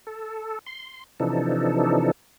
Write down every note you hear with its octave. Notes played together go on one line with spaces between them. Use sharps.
A4
C6
C3 E3 F3 D4 D#4 A4